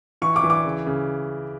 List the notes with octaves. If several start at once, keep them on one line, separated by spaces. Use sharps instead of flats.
E3 C#6
D6
E3
D6
C#3
C#3